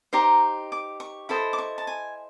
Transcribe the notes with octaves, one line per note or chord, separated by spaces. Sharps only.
D#4 G4 C5 A#5
D6
C#6
E4 A4 C5 D#5 B5
D6
C#6
A5
G#5